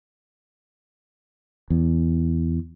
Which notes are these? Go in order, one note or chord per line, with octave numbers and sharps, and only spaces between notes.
E2